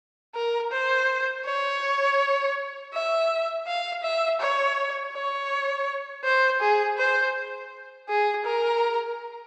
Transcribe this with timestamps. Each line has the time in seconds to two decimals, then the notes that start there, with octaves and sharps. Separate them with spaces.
0.35 A#4
0.72 C5
1.46 C#5
2.93 E5
3.67 F5
4.03 E5
4.40 C#5
5.13 C#5
6.24 C5
6.61 G#4
6.98 C5
8.09 G#4
8.45 A#4